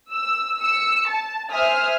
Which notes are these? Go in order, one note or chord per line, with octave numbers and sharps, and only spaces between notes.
E6
E6 C#7
A5
C5 E5 G#5 D#6 F6